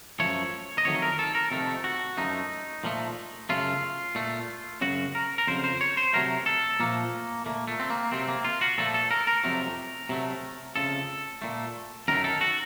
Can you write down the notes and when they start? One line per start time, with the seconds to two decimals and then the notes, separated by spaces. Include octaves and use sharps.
0.20 F#2 F3 A3 C#5
0.78 D#5
0.85 F2 D#3 F#3 A3 C#5
1.02 A#4
1.19 A4
1.35 A#4
1.51 F2 C3 D#3 A3 A4
1.84 F#4
2.17 F#2 F3 A3 D#4
2.84 A#2 F3 A3
3.49 F#2 C#3 A3 F4
4.15 A#2 A3
4.81 F#2 C#3 F#3 F#4
5.15 A#4
5.38 A#4
5.47 F2 C#3 F#3 C5
5.64 C5
5.81 C#5
5.97 C5
6.13 C3 F#3 A3 A#4
6.46 A4
6.80 A#2 F3 A3 A#3
7.46 A#2 A3 A#3
7.68 A3
7.80 C4
7.90 A#3
8.12 C3 F#3 A3 C4
8.28 A#3
8.45 F4
8.61 F#4
8.78 A#2 F3 A3 A4
8.94 A4
9.11 A#4
9.27 A#4
9.44 F2 C3 F#3 A3
10.09 C3 F#3 A3
10.76 F2 C#3 F3 A3 A4
11.42 A#2 A3
12.08 F#2 D#3 F#3 A3 A#4
12.24 A4
12.41 F#4